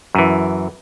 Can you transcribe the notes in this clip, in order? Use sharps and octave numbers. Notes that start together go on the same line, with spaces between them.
F#2 E3